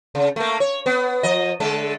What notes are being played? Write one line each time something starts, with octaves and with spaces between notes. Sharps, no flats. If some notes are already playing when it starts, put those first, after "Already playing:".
C#3
A3 A#3
C#5
B3
F3 D#5
D3 G#3 A4